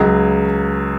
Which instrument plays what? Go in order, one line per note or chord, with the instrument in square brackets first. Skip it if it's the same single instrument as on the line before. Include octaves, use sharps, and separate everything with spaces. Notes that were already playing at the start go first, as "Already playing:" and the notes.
Already playing: [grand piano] C#2 C#3 F#3